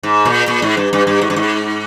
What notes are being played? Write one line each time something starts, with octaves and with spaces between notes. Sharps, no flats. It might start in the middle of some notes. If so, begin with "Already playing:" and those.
G#2
A#2
A#2
G#2
G2
G2
G2
G#2
G2
G#2